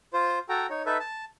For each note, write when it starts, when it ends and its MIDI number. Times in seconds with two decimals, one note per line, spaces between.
0.13 0.39 65
0.13 0.39 72
0.49 0.66 66
0.49 0.66 69
0.49 0.66 79
0.49 0.66 82
0.70 0.83 63
0.70 0.83 73
0.86 0.97 63
0.86 0.97 69
0.86 0.97 71
0.86 0.97 76
1.00 1.25 81